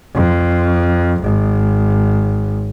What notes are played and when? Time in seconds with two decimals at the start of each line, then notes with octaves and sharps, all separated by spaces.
0.14 F2
1.22 G#1